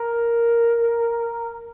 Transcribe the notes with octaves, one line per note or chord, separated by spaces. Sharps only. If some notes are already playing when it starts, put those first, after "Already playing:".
Already playing: A#4